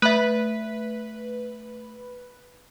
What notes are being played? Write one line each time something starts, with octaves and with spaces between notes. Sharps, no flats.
A3 B4 E5